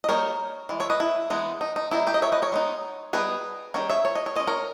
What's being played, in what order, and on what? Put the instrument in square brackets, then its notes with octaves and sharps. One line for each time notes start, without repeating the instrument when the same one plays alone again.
[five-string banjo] D#5
G3 A#3 D#4 A#4 C#5
E3 G#3
C#5 E5
B4 D#5
E4
E3 G#3 B3 D#4
D#4
D#4
D#3 G3 A#3 D#4 E4
D#4 G4
D#5
C#5 E5
B4 D#5
A#4 C#5
G#3 B3 D#4
G3 B3 D#4 G#4 B4
D#3 G3 C#4 A#4 C#5
C#5 E5
C#5
D#5
C#5
G#3 C#4 D#5
A#4 C#5